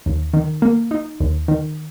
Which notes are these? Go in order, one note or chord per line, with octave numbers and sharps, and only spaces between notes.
D#2
D#3
A#3
D#4
D#2
D#3